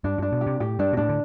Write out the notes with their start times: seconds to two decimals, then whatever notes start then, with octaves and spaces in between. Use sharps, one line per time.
0.04 G2 D4
0.18 G2 D4
0.32 B2
0.41 G4
0.47 C3
0.60 A2 G4
0.79 G2 D4
0.93 B2
0.97 A2 D4
1.09 D3